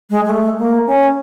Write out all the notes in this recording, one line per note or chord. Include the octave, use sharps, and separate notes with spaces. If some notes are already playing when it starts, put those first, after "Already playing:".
G#3
G#3
A3
A#3
C#4